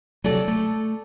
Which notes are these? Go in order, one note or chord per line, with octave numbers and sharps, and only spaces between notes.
C3 F#3 A4 D5
A3